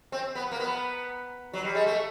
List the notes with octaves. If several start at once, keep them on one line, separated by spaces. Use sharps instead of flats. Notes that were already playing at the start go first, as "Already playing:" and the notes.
C4
B3
A#3
B3
F#3
G3
G#3
A3